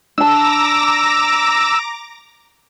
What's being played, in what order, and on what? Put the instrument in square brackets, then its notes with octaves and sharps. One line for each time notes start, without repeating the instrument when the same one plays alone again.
[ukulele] D4 A5 [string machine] A#5 D6 A#6 [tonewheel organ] E6